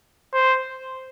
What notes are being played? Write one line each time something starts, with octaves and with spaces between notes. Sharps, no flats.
C5